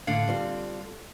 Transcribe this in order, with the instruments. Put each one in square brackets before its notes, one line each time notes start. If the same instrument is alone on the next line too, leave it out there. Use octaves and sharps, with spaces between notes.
[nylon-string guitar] A2 [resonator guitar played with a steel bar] D3 F5
[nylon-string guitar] G3 C4 F4